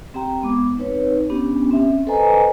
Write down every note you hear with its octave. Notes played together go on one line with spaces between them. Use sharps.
C4 G4 G5 A#5
G#3 B3 D6
C4 D#4 B4 C#5
B3 C#4 D4 G4
C4 C#4 E5
A4 B4 C5 D#5 G#5 A#5